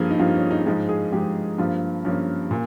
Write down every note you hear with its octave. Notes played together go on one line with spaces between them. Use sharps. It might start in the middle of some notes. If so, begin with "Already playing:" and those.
Already playing: G2 F3 A#3 G#4
D#4
G2 F3 A#3 F4
C#4
D#4
G#2 F3 G#3 D#4
G#4
G#2 F3 G#3 G4
G2 F3 A#3 F4
G2 F3 A#3 C#4
A#2